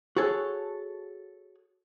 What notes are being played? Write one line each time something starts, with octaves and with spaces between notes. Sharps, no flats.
F#4 G#4 A4 C#5 F#5